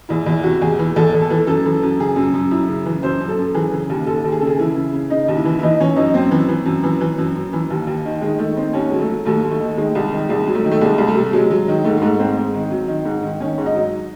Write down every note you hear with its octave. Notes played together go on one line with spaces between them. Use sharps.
E2 E4
E2 E4
C3 F#4
E2 G#4
E3
E2 A4
E2
A4
E3
F#2 A4
E3
F#2
C#3 G#4
F#2
F#2
F#2 E4
C#3
E3
F#2 C5
F#2
A4
F#2
E3 G#4
C#3
D#2
D#2 A4
D#2
G#4
C#3 A4
G#4
E3 E4
C#3
C#3
C#3 D#4
D#2
E4
E3
E4
E3 D#4
E3 C#4
F#2 D#4
F#2 C4
E3
E3
F#2
E3
E3
F#2
F#2
E3
D#2
D#2
D#3
D#3 G#3
D#3 A3
D#3 C4
D#2 C#4
F#3 G#3
A3
F#3
D#2 A3
D#2
A3
D#3
D#3 G#3
C2
D#3
C2 G#3
F#3
A3
D#3
A3
C2 G#3
C2
A3
C3
F#3 G#3
F#3
D#3
G#2 A3
G#3
G#2 A3
G#2 C4
G#2
D#3
F#3
D#3
G#2
D#3
D#3 C#4
G#2
D#4
F#3